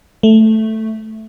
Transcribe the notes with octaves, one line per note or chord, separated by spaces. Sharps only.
A3